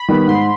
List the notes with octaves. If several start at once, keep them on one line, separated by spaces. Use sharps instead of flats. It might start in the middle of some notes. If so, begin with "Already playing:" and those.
Already playing: B5
D#3 G3 B3
G#2 C6